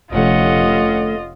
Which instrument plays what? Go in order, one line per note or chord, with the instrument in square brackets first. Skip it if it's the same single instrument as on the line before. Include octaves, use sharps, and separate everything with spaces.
[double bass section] F1 [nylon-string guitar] D2 A3 [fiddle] C#4 F#5 [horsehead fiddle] F4 D#5